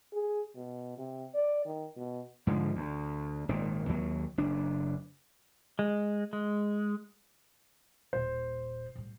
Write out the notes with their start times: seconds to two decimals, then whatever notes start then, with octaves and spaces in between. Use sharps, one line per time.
0.13 G#4
0.56 B2
0.98 C3
1.34 D5
1.66 D#3
1.97 B2
2.47 G#2 D3 F3
2.76 D2
3.49 G#1 A#2 D#3
3.89 D#2 F#3
4.38 F#1 D4
5.79 G#3
6.33 G#3
8.13 D#1 A#2 C5
8.95 A2 G3